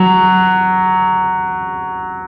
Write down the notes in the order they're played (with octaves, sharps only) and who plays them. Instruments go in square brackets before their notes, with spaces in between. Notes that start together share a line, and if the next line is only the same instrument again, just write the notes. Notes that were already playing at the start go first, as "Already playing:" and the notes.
Already playing: [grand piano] F#3